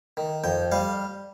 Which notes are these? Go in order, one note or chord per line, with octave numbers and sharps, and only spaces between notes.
D#3
F2 G5
G3 F5